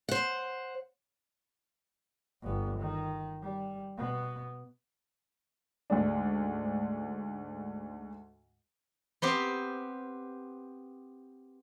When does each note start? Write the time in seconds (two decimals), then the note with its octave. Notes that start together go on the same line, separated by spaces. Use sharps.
0.09 C5 F#5
2.43 G1 B3
2.79 D#3
3.42 G3
3.98 B2 B3
5.90 D2 G#2 D4
9.22 B3 C4 G4